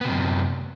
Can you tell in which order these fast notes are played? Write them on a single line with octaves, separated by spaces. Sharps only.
B3 C3 F#2